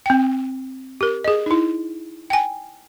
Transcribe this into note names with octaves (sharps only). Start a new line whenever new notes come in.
C4 G5
G4 A#4
G#4 D#5
D#4 E4
G5 G#5